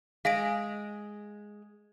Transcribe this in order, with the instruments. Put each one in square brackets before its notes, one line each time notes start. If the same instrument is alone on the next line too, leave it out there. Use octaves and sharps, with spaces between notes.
[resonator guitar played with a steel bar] G#3 [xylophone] F5 A#6 D7